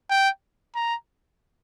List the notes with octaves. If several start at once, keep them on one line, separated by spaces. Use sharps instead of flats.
G5
A#5